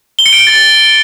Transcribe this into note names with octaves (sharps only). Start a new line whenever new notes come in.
G7
C#7
D7
C#7
A6